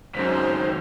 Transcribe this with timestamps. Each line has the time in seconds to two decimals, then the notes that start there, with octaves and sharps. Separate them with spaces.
0.15 C#2 F#2 D#3 C5 B6